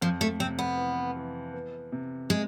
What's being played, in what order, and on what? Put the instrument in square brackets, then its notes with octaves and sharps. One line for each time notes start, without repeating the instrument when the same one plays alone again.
[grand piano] F2 [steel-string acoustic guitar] F3
[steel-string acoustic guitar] A3
[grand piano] C3 [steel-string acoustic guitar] C4
[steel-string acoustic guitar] B3
[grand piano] E3
E3
B3
C3
[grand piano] C3 [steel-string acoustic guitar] G#3